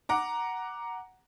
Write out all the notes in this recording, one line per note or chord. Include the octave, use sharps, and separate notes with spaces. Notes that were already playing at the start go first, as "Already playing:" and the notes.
F#5 A#5 D6